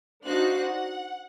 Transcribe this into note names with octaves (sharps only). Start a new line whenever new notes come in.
D4 D#4 F#4 C5 F5 F#6
F#5